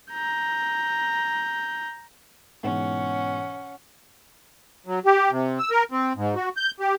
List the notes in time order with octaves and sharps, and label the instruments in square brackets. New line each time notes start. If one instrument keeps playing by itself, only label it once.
[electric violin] A#5 G6
[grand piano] G#2 B2 E3 [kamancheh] C#4 F#5
[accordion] F#3
G4
C3
E6
A#4
C4
G#2
F#4
G6
G4